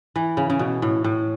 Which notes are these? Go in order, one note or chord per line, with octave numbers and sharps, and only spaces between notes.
E3
C#3
C#3
B2
A2
A2